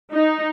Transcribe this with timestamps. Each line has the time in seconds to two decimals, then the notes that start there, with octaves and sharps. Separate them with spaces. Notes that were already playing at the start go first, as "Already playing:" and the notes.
0.12 D#4